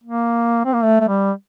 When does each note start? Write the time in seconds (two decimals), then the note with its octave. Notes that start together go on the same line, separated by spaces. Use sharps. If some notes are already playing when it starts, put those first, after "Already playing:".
0.04 A#3
0.65 C4
0.74 A#3
0.83 A3
1.01 A3
1.08 G3